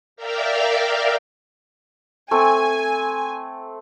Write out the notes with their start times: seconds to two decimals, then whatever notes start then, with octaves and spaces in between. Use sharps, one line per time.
0.16 A#4 D5 E5 F5 G5 A#5
2.31 A3 C4 G#5